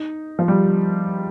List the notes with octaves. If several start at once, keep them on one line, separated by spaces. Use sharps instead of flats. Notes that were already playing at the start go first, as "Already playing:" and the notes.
Already playing: D#4
F3
G3